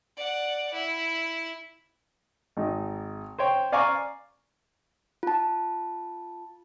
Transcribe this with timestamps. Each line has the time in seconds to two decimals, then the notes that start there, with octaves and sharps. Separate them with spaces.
0.17 D5 F#5
0.73 E4
2.57 G#1 D#4
3.38 C5 C#5 G5
3.72 D5 F5 G#5 A#5 C#6 D6
5.23 F4 A5